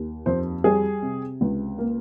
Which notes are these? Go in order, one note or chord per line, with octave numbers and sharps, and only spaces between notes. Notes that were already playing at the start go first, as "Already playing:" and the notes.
Already playing: D#2
F2 C5
G3 G#4
C3
C#2
A#3